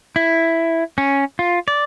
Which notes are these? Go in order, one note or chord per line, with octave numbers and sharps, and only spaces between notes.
E4
C#4
F4
D5